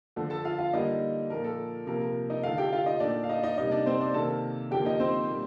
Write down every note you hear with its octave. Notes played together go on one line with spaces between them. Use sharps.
D3 F3 A3
A4 A5
F4 F5
F4 F5
D3 G3 A#3 D#4 D#5
A#2 F3 A#3 A#4
A4
C3 F3 A#3 A#4
A#4
D#4 D#5
D3 A3 F4 F5
G4 G5
F4 F5
D#4 D#5
A#2 A3 D4 D5
F5
D#4 D#5
D#4 D#5
C3 G3 A#3 D#4 D#5
D4 D5
C4 C5
D4 D5
C3 D#3 A#3 A4 A5
D3 F3 A#3 G4 G5
D#4 D#5
C4 C5
A#2 G3